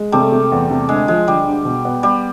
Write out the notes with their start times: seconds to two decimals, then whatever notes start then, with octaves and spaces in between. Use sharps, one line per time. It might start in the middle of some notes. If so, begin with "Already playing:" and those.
Already playing: G#3
0.12 C3 G3 A3
0.32 C3
0.52 E2
0.70 C3
0.89 D2 G#3
1.08 F3 G#3
1.28 D3 G3
1.47 D2
1.65 B2
1.85 B3
2.03 G3 B3